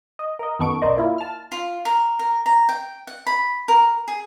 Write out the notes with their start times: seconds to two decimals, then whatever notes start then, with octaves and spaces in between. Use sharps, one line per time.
0.19 D#5
0.39 A#4 D#5
0.59 F#2 D#3 B3 A4 C#6 D7
0.82 B1 F#2 A#4 C5 D5 D#5
0.97 A#3 E4 F4
1.18 A5 F6
1.52 F4
1.85 A#4
2.19 A#4
2.46 A#5
2.69 G5
3.07 F#5
3.27 B5
3.68 A#4
4.08 G#4